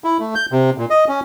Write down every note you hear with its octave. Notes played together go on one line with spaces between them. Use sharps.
E4
A3
G6
C3
A#2
D#5
C#4